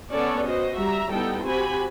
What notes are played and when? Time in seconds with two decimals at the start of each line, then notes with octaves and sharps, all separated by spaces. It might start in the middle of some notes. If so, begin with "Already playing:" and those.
0.13 B3 C#4 A4 C#5 D5
0.47 F#4 C5 D#5
0.77 G3 E5 A#5
1.11 G3 B3 D#4 E4 A4 G5
1.43 C4 F#4 G4 C5 G#5 B5